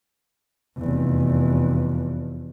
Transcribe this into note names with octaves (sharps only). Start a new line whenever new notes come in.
F1 E2